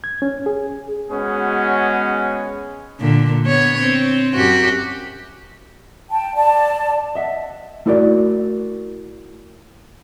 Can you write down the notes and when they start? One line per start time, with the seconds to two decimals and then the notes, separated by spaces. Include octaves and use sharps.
0.04 G#6
0.22 C#4
0.46 G#4
1.10 G#3 B3 C#4 F#4 G#4
3.00 A#2 D3
3.46 B3 C#5
3.81 C4
4.36 F#2 F#4 G4
6.11 G5 A5
6.36 D5 A5
7.15 D#5 E5 F#5
7.86 A3 E4 F#4 A#4 D5